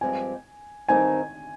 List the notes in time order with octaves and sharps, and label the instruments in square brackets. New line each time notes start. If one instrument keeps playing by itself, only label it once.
[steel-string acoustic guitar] G2 F3 G#3 C4 G4 [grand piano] G#5
[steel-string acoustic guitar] G2 D#3 G3 C4 D#4 [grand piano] G#5